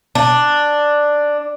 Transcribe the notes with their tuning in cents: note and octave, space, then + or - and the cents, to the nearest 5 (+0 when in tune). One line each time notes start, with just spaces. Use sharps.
D4 +5